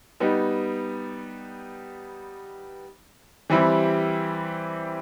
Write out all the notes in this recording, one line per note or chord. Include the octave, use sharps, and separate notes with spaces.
G3 B3 D#4
E3 G3 C4 E4 G4